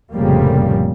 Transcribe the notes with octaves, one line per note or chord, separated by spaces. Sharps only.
F1 F2 A2 C#3 G3 A#3